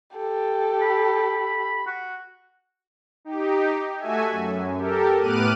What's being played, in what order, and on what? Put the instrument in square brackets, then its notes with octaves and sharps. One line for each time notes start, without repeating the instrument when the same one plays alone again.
[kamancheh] G4 A4
[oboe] B5
F#4
[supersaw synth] D#4 G4
A3 F#4 A4 E5 G#5
F#2
G4 A4 A#4
A2 B3 D6 F6 F#6 D#7